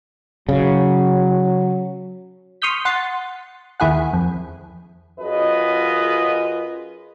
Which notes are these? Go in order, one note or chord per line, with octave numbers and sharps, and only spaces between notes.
C#3 F#3
C6 C#6 D#6 F6 G6 B6
F#5 C6 A6
D#2 E4 G#4 F#5
F2
F#2 F4 G#4 B4 D#5